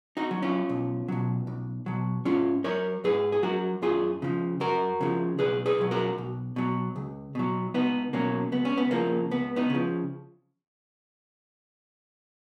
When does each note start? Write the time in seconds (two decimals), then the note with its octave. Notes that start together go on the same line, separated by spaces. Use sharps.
0.17 D#4 F#4
0.31 F#3
0.42 C#4 F4
0.69 B1
1.08 B2 F#3
1.47 B1
1.86 B2 F#3
2.25 G#2 C#4 F4
2.64 F#3 A#4 C#5
3.04 G#2 G#4 B4
3.32 G#4
3.43 F#3 F#4 A#4
3.82 F#2 F4 G#4
4.22 C#3 F3
4.60 F#2 F#4 A#4
5.01 C#3 F3
5.38 B1 G#4 B4
5.66 G#4 B4
5.78 B2 F#3
5.91 F#4 A#4
6.18 B1
6.56 B2 F#3
6.96 C#2
7.35 B2 F#3
7.74 C#2 B3 D#4
8.13 B2 F#3 A#3 C#4
8.52 C#2 B3
8.65 C#4
8.77 B3
8.91 C#3 F3 A#3
9.31 C#2 B3
9.56 B3 D#4
9.70 C#3 F3